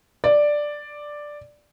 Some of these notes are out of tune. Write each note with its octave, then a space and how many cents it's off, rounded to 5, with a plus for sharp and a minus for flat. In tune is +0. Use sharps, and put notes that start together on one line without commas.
D5 +5